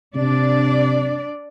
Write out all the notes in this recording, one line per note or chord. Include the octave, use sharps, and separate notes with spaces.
C3 D4 D5